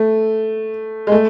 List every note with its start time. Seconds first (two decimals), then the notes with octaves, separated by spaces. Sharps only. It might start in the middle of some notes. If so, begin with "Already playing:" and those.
Already playing: A3
1.07 G#3
1.12 A3